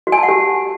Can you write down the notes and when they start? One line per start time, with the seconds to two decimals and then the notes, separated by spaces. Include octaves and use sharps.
0.07 F#4
0.12 G#5
0.18 A5
0.23 F#5
0.29 G4